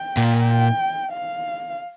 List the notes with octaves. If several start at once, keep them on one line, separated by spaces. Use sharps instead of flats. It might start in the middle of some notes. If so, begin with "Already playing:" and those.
Already playing: G5
A#2
G5
F5